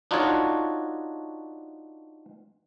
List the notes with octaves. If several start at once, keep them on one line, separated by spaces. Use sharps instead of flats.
D4 D#4 F4 F#4 A4 C#5